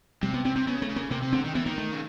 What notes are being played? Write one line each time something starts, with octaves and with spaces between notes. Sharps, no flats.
C3 G3
B3
C3 C4
C3 C4
C#3 B3
A3
C#3
A#3
C3 A#3
C3
D3 C4
D#3
E3 B3
D#3 A#3
A3
C#3